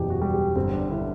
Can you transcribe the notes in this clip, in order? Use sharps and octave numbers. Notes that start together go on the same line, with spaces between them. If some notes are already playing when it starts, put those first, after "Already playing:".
Already playing: F#1 E2 B2 G4
F#4
G3
G4
G1 C4
D4
D3 E4